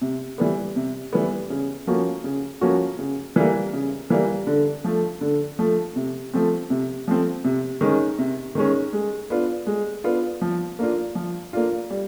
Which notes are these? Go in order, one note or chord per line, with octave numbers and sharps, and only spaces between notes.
C3
E3 G3 B3
C3
E3 G3 B3
C#3
F3 A#3 C#4 F#4
C#3
F3 A#3 C#4 F#4
C#3
E3 G3 A#3
C#3
E3 G3 A#3
D3
F3 A3
D3
F3 A3
C3
F3 A3 C4
C3
F3 A3 C4
C3
D#3 G#3 C#4
C3
D#3 G#3 C#4
G#3
B3 D4 F4
G#3
B3 D4 F4
F3
A#3 D4 F4
F3
A#3 D4 F4
G3